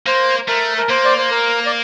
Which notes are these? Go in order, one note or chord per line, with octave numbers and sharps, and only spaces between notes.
A#3 C5
A3 A#4
A#4
A#3 C5
D5
C5
A#4
D5